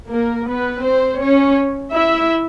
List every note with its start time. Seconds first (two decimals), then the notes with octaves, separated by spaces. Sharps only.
0.10 A#3 A#4
0.47 B3 B4
0.83 C4 C5
1.20 C#4 C#5
1.92 E4 E5